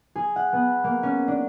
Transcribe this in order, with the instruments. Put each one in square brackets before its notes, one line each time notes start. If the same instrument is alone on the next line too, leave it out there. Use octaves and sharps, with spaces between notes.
[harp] G#4
F#5
B3
A#3
C#4
D4